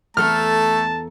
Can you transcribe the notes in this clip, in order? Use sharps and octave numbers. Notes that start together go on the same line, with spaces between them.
E2 A3 A4 A5 A#5 F6